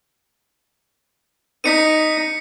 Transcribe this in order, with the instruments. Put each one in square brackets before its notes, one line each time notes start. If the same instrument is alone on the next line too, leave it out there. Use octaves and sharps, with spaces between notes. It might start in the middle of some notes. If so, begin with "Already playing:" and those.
[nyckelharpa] D#4 [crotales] B6 C#7 D#7